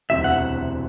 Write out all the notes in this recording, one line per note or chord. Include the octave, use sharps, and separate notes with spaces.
E1 D2 C3 F#3 C4 E5
F#5